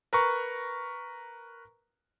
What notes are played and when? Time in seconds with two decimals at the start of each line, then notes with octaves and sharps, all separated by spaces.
0.13 A#4 B4 A#5 C#6